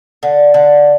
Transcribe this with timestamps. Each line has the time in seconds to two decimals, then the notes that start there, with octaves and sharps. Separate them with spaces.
0.23 D3
0.54 D3